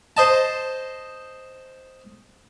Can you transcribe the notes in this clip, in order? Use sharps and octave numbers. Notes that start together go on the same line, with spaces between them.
C5 D#5 A5